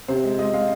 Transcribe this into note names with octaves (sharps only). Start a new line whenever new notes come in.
C3 C5
G#3
G#3 D#5
G#3 F5